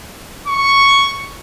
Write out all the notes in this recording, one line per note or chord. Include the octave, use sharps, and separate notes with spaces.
C#6